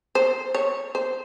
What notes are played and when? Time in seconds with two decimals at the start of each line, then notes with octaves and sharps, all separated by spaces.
0.15 C5
0.55 C#5
0.95 C5